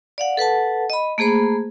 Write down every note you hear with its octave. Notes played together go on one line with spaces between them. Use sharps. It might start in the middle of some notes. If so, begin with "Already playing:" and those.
D5 F5 F#5
A4 B4 F#5 A5
D#5 B5
A3 A#3 G#4 C5 B5